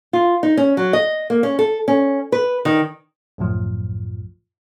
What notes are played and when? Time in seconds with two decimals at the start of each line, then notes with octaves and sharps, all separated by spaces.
0.13 F4
0.43 D#4
0.57 C#4
0.77 F#3
0.93 D#5
1.30 A#3
1.43 C#4
1.59 A4
1.88 C#4
2.32 B4
2.65 D#3
3.38 C2 F#2 A2 F3